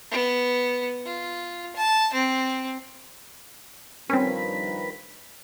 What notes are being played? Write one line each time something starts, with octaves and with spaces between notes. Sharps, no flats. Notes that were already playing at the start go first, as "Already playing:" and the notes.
B3
F4
A5
C4
G2 D#3 F3 C4 C#4 A#4 B4 B5